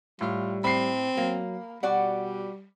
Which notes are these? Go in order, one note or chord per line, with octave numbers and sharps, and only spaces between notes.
A2 G3 F4
A2 C4 B5 C7
F#3 A#3
B2 G3 F#4 D5 F#5